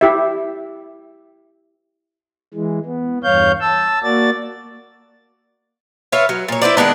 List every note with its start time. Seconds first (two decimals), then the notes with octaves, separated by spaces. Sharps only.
0.01 E4 G4 E5
2.54 E3 G#3
2.86 B3
3.24 E2 G2 C#5 F5 G6
3.61 A5 E6
4.03 A#3 F#4 D5 A6
6.12 F4 B4 C#5 E5
6.29 F#3
6.49 A#2 C#5
6.62 E4 B4 C5 D5
6.77 D#3 G#3 B3 D4